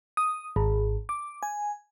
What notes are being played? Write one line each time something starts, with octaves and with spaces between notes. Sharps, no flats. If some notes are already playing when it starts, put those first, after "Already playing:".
D#6
G#1
D6
G#5